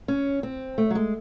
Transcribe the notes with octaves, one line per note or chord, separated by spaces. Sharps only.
C#4
C4
A3
F#3
G#3